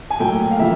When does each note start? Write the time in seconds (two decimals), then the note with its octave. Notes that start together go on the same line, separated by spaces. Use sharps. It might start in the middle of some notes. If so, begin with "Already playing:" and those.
0.10 G#5
0.20 A#2 F#3 A3 G5
0.51 F5
0.59 C#3 F3 A#3 E5